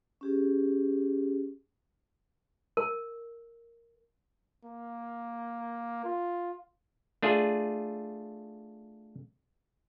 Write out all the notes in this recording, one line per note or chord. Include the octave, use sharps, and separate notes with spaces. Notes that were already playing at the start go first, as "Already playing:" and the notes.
C#4 G4 G#4
A#4
A#3
F4
A3 D4 F4 G#4